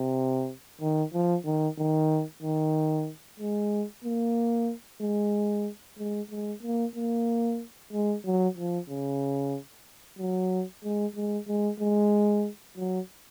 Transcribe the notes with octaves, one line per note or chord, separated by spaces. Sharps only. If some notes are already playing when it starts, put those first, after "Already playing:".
Already playing: C3
D#3
F3
D#3
D#3
D#3
G#3
A#3
G#3
G#3
G#3
A#3
A#3
G#3
F#3
F3
C#3
F#3
G#3
G#3
G#3
G#3
F#3